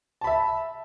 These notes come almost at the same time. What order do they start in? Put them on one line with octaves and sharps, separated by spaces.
A5 B5 E5